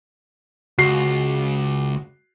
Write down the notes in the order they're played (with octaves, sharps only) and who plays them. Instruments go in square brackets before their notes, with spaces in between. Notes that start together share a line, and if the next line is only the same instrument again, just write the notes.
[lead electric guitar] C#2 [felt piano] F#4 C7